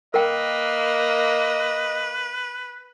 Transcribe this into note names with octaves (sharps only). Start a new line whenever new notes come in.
A#3 A#4 B4 D#5 G5